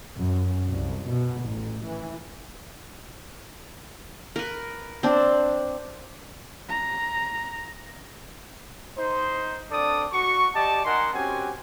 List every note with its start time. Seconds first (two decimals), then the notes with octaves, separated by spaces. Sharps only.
0.16 F#2
0.69 C2
1.07 B2
1.42 A1
1.84 E3
4.36 A#4 B4
5.03 C4 D4
6.69 A#5
8.98 D#4 C5
9.71 C4 D4 A4 D5 D#6
10.13 F#4 C#6
10.55 G4 D5 D#5 A5
10.85 D#4 A#4 F#5 G#5 C6
11.14 C4 C#4 F#4 G4 G#5